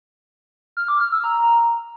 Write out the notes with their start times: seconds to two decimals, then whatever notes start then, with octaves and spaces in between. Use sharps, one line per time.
0.77 F6
0.88 D6
1.00 F6
1.12 E6
1.24 A#5